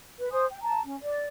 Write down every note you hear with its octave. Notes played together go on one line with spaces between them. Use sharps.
B4
C5 G#5 D#6
G5
A5 A#5
C#4
D5